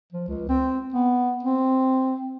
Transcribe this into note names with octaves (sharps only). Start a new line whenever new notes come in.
F3
C#2
C4
B3
C4